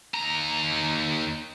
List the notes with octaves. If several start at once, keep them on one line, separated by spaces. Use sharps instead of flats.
D#2 A#5